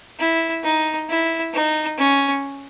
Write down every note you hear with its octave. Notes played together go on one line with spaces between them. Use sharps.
E4
D#4
E4
D#4
C#4